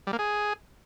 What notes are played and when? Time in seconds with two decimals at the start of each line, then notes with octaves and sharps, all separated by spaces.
0.07 G3
0.13 A#3
0.19 G#4